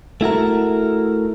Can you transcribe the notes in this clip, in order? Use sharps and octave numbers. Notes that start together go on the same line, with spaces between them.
A3 E4 F#4 A#4